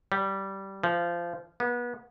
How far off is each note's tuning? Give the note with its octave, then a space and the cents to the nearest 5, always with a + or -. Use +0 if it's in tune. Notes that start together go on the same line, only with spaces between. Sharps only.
G3 -15
F3 -20
B3 -30